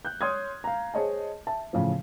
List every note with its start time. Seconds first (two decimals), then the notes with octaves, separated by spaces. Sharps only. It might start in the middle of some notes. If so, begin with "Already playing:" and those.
0.05 F#6 G6
0.21 C#5 C6 D#6 F6 G#6
0.64 F5 A#5
0.94 G#4 C5 C#5 D#5 A5
1.47 E5 A5
1.73 A2 C#3 E3 F3